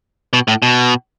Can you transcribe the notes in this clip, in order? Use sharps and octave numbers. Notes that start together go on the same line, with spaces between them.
B2
A2
B2